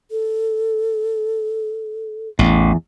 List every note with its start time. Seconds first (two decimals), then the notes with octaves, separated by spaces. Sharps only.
0.11 A4
2.39 A1 E2